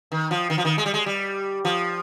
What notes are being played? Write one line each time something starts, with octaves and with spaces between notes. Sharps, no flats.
D#3
F3
D#3
F3
D#3
G#3
G3
G#3
G3
F3